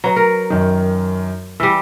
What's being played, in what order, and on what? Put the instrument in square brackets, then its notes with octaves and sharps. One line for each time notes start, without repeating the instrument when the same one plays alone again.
[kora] F#3 [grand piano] B4 A#5
[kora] A#4
[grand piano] F#2 D#3
[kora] E3 G3 [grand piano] E6